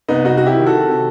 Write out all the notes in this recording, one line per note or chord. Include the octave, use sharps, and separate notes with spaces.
C2 B3 D#4
C2 D#4 F#4
C3 F#4
E4 G4
D#3
F#4 A4
D#3
C3